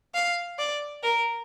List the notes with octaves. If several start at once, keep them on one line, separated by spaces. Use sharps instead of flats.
F5
D5
A#4